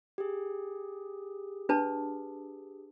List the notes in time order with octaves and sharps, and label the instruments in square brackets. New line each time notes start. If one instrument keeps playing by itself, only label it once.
[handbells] G4 G#4
[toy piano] D4 B4 A5